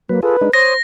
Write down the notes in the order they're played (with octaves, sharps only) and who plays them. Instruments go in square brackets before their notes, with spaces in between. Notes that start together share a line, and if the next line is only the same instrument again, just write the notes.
[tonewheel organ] F#3 B4 [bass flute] A#3
[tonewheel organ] F4 G#4 A4 [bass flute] B4
[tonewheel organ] G#3 D4 D#4
[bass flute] C5 [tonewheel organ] C#5 D#6 [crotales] A#6